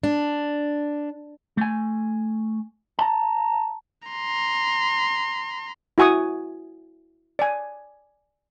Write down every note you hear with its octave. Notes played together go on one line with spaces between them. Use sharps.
D4
A3 G#5
A5 A#5
A#5 C6
E4 F#4 G#5 C#6 D#6
D5 G#5